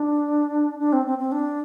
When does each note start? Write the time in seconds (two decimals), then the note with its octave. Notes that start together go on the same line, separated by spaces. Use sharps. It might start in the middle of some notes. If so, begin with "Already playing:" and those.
Already playing: D4
0.79 D4
0.93 C4
1.06 C4
1.18 C4
1.32 D4